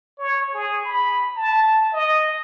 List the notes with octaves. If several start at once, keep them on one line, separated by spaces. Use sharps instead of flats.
C#5
G#4
B5
A5
D#5